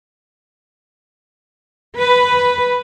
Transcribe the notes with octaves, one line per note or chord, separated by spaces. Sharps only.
B4